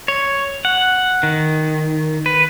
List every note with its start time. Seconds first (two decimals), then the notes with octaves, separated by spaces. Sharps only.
0.08 C#5
0.65 F#5
1.23 D#3
2.26 B4